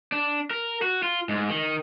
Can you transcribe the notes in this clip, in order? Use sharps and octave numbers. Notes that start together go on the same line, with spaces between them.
D4
A#4
F#4
F4
G#2
D#3